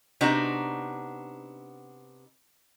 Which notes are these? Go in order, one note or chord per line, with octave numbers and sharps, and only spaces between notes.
C3 B3 D4 D#4 F#4 A#5